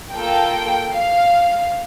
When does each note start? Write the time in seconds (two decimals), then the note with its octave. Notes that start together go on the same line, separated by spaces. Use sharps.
0.12 A#3 F4 A4 G5
0.93 F5